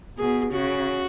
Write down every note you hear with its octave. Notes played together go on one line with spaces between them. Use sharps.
B2 G#4
C#3 F#4